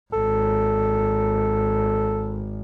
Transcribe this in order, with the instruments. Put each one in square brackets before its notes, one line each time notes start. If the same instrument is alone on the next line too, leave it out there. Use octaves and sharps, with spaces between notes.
[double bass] G#1 [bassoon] A4